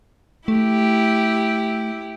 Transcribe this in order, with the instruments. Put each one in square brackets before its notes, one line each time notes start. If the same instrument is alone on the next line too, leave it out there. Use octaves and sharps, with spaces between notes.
[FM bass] A3 [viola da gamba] E4 G4